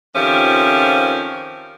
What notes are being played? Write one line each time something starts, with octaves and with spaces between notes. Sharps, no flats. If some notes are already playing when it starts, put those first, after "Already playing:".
F2 D#3 F3 C#4 G4 E5